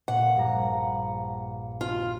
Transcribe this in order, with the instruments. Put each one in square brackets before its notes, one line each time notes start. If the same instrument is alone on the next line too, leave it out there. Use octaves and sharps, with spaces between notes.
[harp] A#2 [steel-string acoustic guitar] F#5
[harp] A#1 G2 A#5
[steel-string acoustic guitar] F4